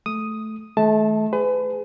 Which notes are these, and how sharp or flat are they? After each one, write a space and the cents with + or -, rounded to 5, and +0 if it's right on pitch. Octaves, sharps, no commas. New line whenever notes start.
A3 -10 D#6 +0
D#3 +20 A3 -35 A5 +0
G#4 +0 B4 +35